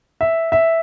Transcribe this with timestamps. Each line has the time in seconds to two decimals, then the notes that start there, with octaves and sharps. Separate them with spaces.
0.21 E5
0.52 E5